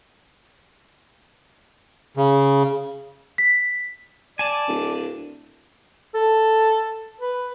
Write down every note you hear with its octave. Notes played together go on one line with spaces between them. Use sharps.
C#3
B6
D5 G#5 A5
D1
A4
B4